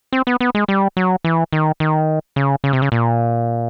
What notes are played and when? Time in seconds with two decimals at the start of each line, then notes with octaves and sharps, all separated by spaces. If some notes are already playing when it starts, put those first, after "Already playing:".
0.12 C4
0.27 B3
0.41 B3
0.55 G#3
0.68 G3
0.97 F#3
1.25 E3
1.53 D#3
1.80 D#3
2.36 C#3
2.64 C#3
2.73 C3
2.82 C#3
2.92 A#2